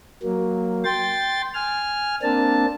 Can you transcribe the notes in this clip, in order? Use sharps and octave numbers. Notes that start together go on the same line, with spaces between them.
F#3 A#3
G5 C6 A6
G#5 F6
A#3 C4 D4 A5